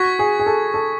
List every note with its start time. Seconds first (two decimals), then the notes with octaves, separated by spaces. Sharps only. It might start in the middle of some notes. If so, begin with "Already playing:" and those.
Already playing: F#4 C#6 G#6 B6
0.19 G#4
0.39 G#4
0.46 A4
0.74 A4